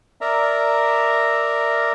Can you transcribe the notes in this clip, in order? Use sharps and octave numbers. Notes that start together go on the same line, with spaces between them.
A#4 D5 E5 A#5